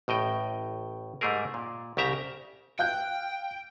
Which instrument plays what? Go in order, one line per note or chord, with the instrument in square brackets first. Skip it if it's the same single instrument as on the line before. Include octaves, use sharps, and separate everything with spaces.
[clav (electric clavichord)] A1 A2 D#5 G5
G#2 G3 A3 G#4 A#4
A#2
C2 C#3 G4 E5 A#5
[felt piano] F5 F#6 G6 [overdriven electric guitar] G5